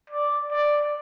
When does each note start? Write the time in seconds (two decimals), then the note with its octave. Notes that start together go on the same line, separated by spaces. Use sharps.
0.10 D5
0.51 D5